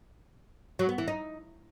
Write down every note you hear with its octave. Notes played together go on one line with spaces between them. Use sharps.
F#3
B3
E3
D#4